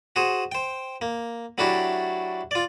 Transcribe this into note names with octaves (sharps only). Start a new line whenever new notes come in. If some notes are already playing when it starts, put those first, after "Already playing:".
F#4 G#4 C5
C5 G5
A#3
F#3 A3 D4 E4 F#4 G4
F4 D5